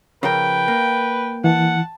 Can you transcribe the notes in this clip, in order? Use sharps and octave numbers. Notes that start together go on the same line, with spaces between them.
C#3 F3 A#4 B4 G5
A#3
E3 F#5 A5